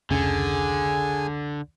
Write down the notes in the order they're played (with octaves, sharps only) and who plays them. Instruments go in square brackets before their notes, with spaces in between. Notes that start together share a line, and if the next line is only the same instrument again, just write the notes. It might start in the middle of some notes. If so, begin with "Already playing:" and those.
[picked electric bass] F1 C#2 C#4 [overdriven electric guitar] D3 [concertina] G#4 G#5